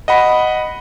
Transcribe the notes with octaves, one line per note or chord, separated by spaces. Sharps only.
D#5 F#5 B5